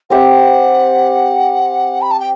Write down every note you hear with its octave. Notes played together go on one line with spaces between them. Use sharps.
C4 G4 C5 E5 F#5
B5
A5
G5